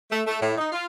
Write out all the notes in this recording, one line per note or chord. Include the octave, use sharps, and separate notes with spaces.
A3
A3
A2
D#4
F4